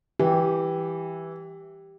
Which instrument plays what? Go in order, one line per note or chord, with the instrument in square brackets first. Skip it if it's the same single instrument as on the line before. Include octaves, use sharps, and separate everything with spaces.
[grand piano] E3 [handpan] G4